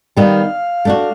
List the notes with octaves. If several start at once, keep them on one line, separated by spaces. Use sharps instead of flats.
D#3 G3 B3 F5
A3 D4 F#4